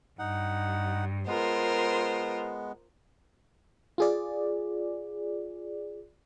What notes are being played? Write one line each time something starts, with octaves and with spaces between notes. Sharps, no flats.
G2 D#4 F#5
G#3 B3 F4 A#4 C5
F4 G#4 D5